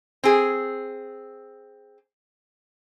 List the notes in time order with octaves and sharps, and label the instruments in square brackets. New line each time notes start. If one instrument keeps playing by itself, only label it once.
[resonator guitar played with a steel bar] C4 G#4